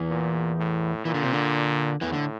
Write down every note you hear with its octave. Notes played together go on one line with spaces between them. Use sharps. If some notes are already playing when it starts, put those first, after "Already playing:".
Already playing: E2 E3
A#2
A2
A#2 E3
D3
C3
D3
E2 A2 E3
D3